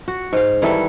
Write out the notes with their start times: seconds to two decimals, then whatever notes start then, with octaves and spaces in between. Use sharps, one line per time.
0.08 F#4
0.33 G#2 F5
0.62 D#3 E3 G3 A4